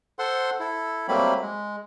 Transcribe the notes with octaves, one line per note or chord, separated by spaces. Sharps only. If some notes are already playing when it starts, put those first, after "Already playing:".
A4 C5 F#5 C6
E4 A4
F#3 G3 A3 A#3 C4 B5
G#3